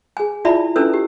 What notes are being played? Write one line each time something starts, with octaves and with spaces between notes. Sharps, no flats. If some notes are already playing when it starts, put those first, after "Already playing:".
G#4 G#5
E4 F4 D5 E5 A5 B5
C#4 D4 E4 A4 B4 E6
G4